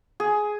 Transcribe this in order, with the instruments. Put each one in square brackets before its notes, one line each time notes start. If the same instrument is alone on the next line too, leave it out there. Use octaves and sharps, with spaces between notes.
[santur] G#4